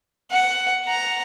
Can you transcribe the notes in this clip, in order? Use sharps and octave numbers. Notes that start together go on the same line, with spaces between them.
F#5
F#5 A#5